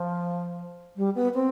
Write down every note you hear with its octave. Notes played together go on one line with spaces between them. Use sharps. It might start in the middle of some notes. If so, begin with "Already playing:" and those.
Already playing: F3
G3
B3
C4